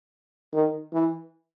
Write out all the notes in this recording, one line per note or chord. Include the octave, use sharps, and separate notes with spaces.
D#3
E3